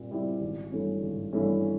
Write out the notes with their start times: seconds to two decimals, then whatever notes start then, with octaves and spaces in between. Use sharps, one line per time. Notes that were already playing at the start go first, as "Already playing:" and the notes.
Already playing: A#2 G3 C4
0.11 G3 C4 E4
0.41 G#1
0.72 G2 E3 A3 C#4
1.03 G#1
1.33 G2 E3 A3 C#4